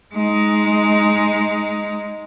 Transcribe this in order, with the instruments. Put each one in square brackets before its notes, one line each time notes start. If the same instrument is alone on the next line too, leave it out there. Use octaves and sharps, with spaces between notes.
[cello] G#3 D#4